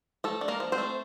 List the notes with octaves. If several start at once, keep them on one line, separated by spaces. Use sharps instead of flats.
F3 A3 A4
D4
A#3 A#4
F3
C4 C5
A3